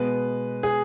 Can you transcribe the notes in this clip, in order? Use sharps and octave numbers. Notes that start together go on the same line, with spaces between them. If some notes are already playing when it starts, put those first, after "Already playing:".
Already playing: B2 G#3 B3 B4
G#4